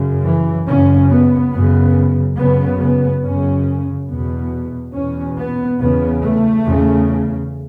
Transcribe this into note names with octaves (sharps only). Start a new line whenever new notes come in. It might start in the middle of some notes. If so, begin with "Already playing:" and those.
Already playing: F#2 C#3
E3
F#2 C#3 C#4
B3
F#2 C#3 B3
F#2 C#3 B3
B3
F#2 C#3 C#4
E2 B2 B3
E2 B2 C#4
B3
E2 C#3 B3
A3
E2 C#3